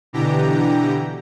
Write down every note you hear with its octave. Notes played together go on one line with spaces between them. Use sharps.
B2 D3 E3 G4 A#5